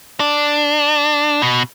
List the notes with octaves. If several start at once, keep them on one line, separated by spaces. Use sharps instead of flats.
D4
B2